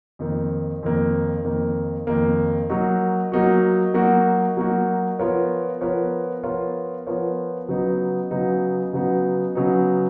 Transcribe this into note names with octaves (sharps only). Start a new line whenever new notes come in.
F2 D#3 A#3
F2 D#3 A#3
F2 D#3 A#3
F2 D#3 A#3
F#3 A#3 D#4 F#4
F#3 A#3 D#4 F#4
F#3 A#3 D#4 F#4
F#3 A#3 D#4 F#4
F3 B3 F4 A#4 C#5
F3 B3 F4 A#4 C#5
F3 B3 F4 A#4 C#5
F3 B3 F4 A#4 C#5
C#3 F#3 B3 D#4
C#3 F#3 B3 D#4
C#3 F#3 B3 D#4
C#3 F#3 B3 D#4